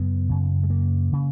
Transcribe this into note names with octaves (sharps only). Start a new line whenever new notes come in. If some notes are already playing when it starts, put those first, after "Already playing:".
Already playing: F#2 C#3 B3
F#2 C#3
G#3
A#3
C#3